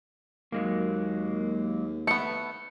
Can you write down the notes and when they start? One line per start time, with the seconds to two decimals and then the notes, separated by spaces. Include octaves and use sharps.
0.52 D#2 F#3 G#3 A#3
2.07 A3 B3 C#7